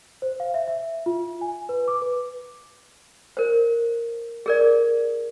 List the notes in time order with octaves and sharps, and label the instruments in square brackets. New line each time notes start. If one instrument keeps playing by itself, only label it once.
[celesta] C5
F5
E5
E5
F4
G#5
B4
D6
B4
[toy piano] A#4 C5
G#4 A#4 D5